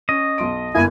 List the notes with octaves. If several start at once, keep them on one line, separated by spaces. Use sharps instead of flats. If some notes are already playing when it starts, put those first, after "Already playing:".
C#4 D#5
B1 C6 D7
G1 A#3 E4 G#5